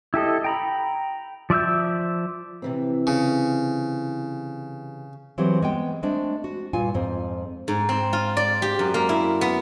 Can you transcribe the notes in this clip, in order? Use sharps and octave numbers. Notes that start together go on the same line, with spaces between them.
E4 G4 A4 D#5
G5 A#5 B5
F3 D5 E5 E6 G6
C3 E3 C4
C#3
E3 F#3 C4 G4
G#3 B3 G5
G#3 A3 C4 D4
F#4
G2 A#2 F4 G#5
F2 G#2 C4
G#2
C4
F4
D5
G4
F#2
A#3
E4
B3